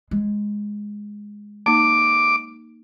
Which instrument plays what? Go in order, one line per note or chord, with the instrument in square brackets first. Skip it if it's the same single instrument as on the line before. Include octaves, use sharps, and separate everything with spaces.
[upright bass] G#3
[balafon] A#3 D#4 [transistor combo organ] D6